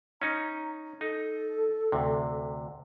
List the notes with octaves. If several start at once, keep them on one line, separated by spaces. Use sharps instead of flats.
C#4 D#4 A#5
D#4 A4
D2 C3